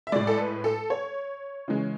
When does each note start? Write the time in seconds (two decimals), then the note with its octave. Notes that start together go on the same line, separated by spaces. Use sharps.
0.07 E5
0.12 A2 G#3 D5
0.27 A4
0.38 B4
0.64 A4
0.90 C#5
1.68 C#3 E3 G#3